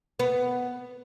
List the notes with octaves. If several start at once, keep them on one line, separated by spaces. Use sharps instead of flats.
B3